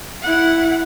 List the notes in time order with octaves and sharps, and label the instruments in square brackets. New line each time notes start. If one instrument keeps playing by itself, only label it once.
[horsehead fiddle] E4 F#5